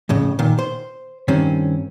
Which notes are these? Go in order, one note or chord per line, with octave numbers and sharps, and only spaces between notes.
F2 A2 C#3
A#2 D#3
C5
G2 D#3 C4 C#4